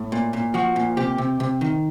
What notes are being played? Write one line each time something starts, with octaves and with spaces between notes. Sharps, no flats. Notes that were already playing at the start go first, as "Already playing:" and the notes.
Already playing: A2
A#2
A#2
F3 F#4
A#2
C3 G4
C3
C3
D#3